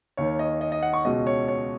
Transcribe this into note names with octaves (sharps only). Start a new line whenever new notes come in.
D#2 D#3 C#5
D#5
D#5
D#5
F#5
C#6
C#2 B2 D#5
C#5
C#5